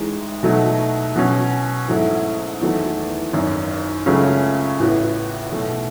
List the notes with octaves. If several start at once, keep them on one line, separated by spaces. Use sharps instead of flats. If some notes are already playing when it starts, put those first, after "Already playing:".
Already playing: A1 A2 G#3 D#4
B2 F#3 A3 D#4
B2 F#3 C#4
G#2 F#3 A3 E4 A4
E2 D#3 F#3 A3
G#1 F#2 D#3
C#2 C#3 F#3 A3 C#4
A1 A2 E3 B3 F#4
B1 B2 A3